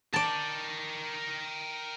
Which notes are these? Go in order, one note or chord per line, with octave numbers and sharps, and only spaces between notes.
A#4 D5 G5 A5